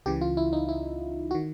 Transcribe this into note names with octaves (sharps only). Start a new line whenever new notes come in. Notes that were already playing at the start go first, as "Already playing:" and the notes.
C#2 C#3 E3 G4
F4
E4
D#4
E4
F#4
D#3